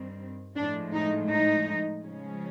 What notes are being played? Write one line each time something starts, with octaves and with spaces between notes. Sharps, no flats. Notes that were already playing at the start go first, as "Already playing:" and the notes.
Already playing: G2 D#3 G3 C4
A2 F3 G#3 D4
D#4
D#4
C#3 F3 G#3 C#4